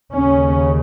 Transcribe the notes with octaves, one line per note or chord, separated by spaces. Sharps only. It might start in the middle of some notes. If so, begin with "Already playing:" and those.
D#2 C#3 C#4